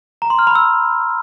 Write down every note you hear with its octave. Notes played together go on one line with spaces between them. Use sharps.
A#5
C6
F6
B5
E6